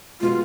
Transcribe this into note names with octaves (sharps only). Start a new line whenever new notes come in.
B2 G#3 F4